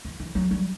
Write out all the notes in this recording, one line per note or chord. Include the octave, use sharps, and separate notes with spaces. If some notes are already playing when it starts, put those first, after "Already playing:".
E3
E3
F#3
G3